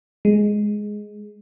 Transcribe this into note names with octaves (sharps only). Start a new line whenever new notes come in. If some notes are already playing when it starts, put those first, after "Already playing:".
G#3